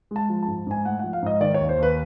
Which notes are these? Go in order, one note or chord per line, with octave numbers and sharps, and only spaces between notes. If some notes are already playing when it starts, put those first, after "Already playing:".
G#3 A5
F3
A5
G#2
G#2 G#5
A3 F#5
F3 F#5
F5
G#2 D#5
D#3 D5
C#5
D#2
C5
D#2
B4